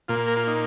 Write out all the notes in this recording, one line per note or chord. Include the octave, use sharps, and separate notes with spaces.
A#2 A#3 F4
A#4
F4
D#4